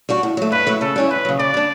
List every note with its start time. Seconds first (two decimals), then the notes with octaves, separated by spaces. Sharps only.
0.09 G3 D4 F#4
0.23 A2
0.37 F#3 A3
0.52 G2 B4
0.67 F#3 A3 E4
0.81 C#3 A4
0.96 G3 C#4 E4
1.10 F#2 B4
1.25 C#3 F#3
1.39 C#3 D5
1.54 G3 D4